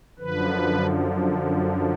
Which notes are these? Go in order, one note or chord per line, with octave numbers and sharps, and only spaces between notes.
F#2 D3 F3 B4